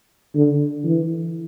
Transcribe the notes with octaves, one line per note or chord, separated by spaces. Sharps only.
D3
E3